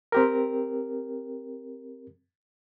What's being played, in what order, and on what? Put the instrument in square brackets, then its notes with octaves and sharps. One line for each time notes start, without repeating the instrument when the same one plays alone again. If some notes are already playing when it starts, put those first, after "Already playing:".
[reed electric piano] C4 G4 A#4